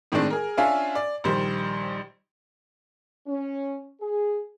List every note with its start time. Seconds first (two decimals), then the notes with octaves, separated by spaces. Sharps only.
0.12 A2 D#3 G#3 C4 D4
0.30 G#4 A#4
0.57 C#4 D4 F4 E5 F5 G#5
0.95 D5
1.24 A#1 D#3 G3 C5
3.27 C#4
4.00 G#4